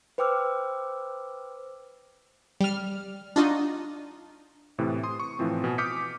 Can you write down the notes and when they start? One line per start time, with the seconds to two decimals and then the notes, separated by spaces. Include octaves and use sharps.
0.18 B4 C5 G5 D6 E6 F6
2.60 G3 F6
3.36 D4 D#4 F4 F#4 D#5
4.79 A2 C3 E3
5.03 C6 D#6
5.20 C#6
5.39 A2 E3 F3 C4
5.64 B2 G#5
5.78 D6 D#6 F6 G6 B6 C#7